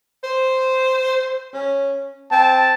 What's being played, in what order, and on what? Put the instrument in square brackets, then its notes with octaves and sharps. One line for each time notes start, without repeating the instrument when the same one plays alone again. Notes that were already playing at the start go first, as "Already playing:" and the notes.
[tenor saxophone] C5
C#4
[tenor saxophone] C4 [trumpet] A5